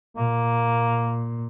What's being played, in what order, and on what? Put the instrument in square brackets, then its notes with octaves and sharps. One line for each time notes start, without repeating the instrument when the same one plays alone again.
[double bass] A#2 [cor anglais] A#3